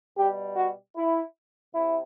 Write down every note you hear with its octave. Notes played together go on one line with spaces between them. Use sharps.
B2 G3 G4
F#4
E4
C3 E4